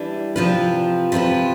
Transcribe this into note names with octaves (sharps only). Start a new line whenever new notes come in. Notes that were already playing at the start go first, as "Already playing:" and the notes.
Already playing: E3 G3 D4
C3 F3 C4 F4 B4
C3 F3 C4 F4 B4